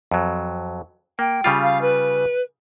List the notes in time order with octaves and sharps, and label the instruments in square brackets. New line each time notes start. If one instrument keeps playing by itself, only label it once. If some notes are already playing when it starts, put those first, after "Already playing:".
[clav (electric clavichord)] F2 F#3
[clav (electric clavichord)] A#3 [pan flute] G5
[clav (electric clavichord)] C#3 G3 F4
[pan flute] F5
B4